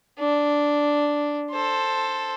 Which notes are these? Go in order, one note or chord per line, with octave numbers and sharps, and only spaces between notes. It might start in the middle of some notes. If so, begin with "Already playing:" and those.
D4
A4 C5